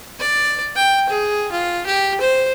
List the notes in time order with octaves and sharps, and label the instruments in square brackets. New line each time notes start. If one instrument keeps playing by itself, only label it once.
[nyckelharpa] D5
G5
G#4
F4
G4
C5